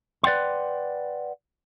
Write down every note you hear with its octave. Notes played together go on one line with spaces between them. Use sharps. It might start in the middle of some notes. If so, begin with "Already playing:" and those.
B4 D5 F#5 G5 C6